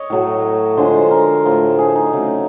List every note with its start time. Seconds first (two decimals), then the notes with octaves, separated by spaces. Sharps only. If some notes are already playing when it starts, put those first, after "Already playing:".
Already playing: C#5 D#5
0.10 A2 F#3 A3
0.77 D3 F3 G#3 C5
0.94 C5
1.11 A#4
1.45 A2 F3 A3
1.78 G#4
1.95 D#4
2.13 C#3 F#3 A3